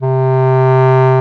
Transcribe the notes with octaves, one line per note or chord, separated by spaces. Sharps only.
C3